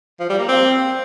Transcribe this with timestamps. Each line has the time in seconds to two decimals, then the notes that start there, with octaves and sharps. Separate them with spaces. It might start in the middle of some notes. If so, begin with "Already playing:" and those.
0.20 F3
0.29 G3
0.39 A#3
0.48 C4